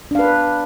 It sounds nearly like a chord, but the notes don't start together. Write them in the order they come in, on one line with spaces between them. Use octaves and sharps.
D4 F5 B4